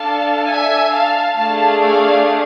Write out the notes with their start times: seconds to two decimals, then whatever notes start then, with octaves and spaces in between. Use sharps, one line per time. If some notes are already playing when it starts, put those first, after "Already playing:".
Already playing: D4 A4 F5 A5
0.48 E5 G#5
0.93 F5 A5
1.37 A3 D4 G#4 F5 A5
1.81 D5 F5